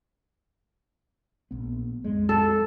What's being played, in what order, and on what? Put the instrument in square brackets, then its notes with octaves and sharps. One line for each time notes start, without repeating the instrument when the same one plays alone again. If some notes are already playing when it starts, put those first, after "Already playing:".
[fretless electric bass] A#1 B3
F2 G#3
[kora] A4